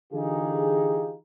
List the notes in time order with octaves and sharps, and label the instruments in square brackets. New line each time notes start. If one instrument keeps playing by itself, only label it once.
[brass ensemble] D3 E3 D#4 F4 G4 G#4